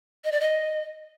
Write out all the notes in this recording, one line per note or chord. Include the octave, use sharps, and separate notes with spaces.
D#5
D5
D#5